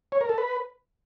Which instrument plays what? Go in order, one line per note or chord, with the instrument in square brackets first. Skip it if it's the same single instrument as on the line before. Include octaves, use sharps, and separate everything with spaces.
[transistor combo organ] C#5
A#4
A4
B4